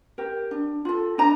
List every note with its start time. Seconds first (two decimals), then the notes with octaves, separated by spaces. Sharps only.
0.18 G4 A#4
0.51 D4
0.85 F4 A4
1.18 D4 A#5